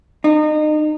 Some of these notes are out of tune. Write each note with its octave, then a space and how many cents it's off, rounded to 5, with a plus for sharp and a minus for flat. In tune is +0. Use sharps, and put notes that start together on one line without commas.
D#4 -30